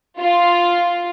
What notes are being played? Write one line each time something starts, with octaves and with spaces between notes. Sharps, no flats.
F4